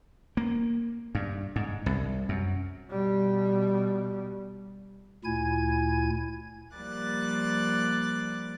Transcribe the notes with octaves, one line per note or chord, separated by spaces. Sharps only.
A#3
G2
G#2
C2
F#2
B2 G3
D2 A#2 E4 G#5 G#6
F3 G3 A#3 D5 F#6 A6